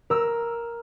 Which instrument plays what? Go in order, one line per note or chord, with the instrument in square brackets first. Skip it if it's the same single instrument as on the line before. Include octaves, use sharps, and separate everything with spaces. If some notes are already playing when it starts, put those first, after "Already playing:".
[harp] A#4 E6